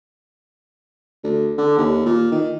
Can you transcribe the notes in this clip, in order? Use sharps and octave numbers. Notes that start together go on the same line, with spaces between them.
D2
D3
D#2
A#2
D#3